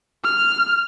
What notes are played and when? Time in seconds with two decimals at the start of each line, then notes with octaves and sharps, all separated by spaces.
0.25 F6